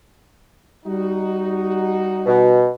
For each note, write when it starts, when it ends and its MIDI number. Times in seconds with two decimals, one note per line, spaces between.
0.86 2.67 55
0.86 2.67 63
0.86 2.67 66
2.26 2.70 47